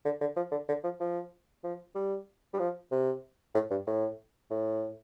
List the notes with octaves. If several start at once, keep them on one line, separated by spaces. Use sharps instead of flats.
D3
D3
F3
D3
D3
F3
F3
F3
G3
G3
F3
C3
A2
G2
A2
A2